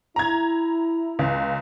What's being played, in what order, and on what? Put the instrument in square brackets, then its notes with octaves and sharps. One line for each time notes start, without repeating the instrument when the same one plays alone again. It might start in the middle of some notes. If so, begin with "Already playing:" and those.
[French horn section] E4 [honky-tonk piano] A#5 G#6
[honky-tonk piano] C#2